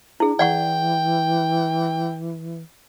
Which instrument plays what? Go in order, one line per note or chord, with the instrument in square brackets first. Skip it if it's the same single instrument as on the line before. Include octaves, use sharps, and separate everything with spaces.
[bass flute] D4 [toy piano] E4 G#4
[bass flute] E3 [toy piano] D5 F#5 C#6 [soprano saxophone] G5